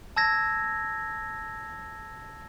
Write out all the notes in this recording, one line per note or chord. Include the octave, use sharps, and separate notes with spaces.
A5 E6 G#6 A#6